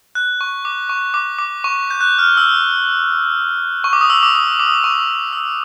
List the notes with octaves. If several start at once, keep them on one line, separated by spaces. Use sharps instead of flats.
F#6
C#6
D6
C#6
D6
D6
C#6
G6
F#6
F6
E6
C#6
D6
D#6
E6
D6
D#6
D6
D#6
D6
C#6
E6